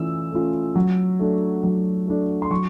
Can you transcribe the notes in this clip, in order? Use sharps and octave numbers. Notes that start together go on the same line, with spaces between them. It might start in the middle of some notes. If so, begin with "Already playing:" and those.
Already playing: E3 A3 C#4 F4 E6
A3 C#4 F4
F#3
A3 D4
F#3
A3 D4
C6
F#3 C#6